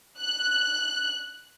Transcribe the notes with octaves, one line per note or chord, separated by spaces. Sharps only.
F#6